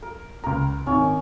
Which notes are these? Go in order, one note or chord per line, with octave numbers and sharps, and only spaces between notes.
A#4
C#2 A#4 A#5
G#1 D#3 C#4